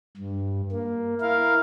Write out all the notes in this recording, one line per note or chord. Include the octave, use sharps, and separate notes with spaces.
G2
A#3
E4 A#4 F5